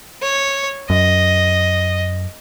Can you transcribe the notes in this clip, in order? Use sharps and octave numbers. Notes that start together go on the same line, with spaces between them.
C#5
F#2 D#5